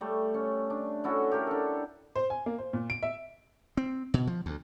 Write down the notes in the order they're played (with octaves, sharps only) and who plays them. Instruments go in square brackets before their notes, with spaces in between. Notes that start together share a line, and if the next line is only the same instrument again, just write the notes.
[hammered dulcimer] G3 A3
C#4
D4
C#4 E4 F#4 A4
G4 A4 A#4
D4 A4
[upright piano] C5
G#5
A#3
C5
A#2
D7
E5
[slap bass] C4
B2
F3
D2